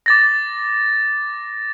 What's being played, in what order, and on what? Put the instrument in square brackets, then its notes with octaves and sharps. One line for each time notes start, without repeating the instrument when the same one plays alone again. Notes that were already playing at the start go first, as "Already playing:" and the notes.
[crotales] D6 A6 A#6